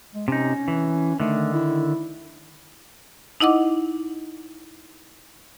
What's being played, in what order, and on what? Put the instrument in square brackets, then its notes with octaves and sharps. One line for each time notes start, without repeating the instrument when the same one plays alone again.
[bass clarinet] G#3
[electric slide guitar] C3 D#4 [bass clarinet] C#4
[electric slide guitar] E3
[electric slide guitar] D3 D#3 [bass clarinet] A3
[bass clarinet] E4
[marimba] D#4 E4 D#5 F#5 D6